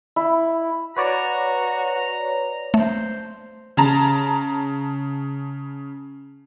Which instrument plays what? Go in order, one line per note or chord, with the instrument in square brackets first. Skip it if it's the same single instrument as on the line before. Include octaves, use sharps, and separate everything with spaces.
[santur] E4
[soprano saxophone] F#4 [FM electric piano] B4 C#5 D5 [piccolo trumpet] A#5
[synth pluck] A3 [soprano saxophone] C5
[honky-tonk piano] C#3 A5 A#5